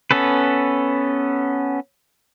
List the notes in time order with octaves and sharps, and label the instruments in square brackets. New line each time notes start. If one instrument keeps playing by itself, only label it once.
[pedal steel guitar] B3 C#4 A4 B4